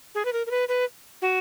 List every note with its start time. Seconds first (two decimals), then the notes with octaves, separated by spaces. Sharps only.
0.15 G#4
0.25 B4
0.33 A#4
0.47 A#4
0.51 B4
0.69 B4
1.22 F#4